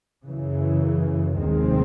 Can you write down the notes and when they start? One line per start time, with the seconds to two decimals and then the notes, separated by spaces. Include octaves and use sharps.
0.23 F#2 C#3 E3
1.36 F1 D#2 D#3 G#3 C4